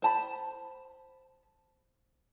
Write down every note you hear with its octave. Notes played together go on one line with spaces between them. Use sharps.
C5 A5 B5